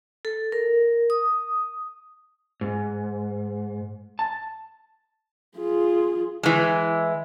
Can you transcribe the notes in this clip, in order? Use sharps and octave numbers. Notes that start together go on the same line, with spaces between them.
A4
A#4
D#6
G#2
A5
F4 G#4
E3 G#3